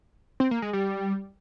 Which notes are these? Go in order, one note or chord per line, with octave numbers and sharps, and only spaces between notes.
C4
A#3
G#3
G3